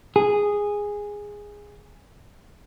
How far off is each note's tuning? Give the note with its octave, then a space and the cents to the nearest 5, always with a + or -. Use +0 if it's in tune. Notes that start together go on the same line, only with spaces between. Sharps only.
G#4 -10